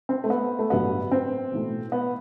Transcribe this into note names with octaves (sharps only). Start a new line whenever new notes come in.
C4
A3
B3
A3
A1 G2 D3 F#3 A3 B3
C4
B1 A2 E3 A3
B3